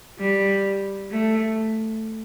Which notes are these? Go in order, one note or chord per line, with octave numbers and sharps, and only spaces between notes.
G3
A3